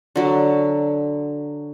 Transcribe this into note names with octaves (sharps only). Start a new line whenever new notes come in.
D3 F#3